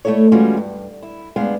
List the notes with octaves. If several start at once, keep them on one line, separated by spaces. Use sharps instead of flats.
A3 B3 E4 A4 C#5
E3 G3 G#3 C#4 F4 F#4
G2
E4
D2 G2 G#3 B3 D4 F5